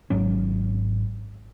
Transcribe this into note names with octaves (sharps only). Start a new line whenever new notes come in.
G#1 G#2 F#3 C#4